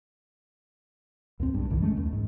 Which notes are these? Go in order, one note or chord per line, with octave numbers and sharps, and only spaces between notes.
D#2 A2 C4
C#2 G2
B1 F#2 D3 E3
G#3 A3 C#4
D#2
G#2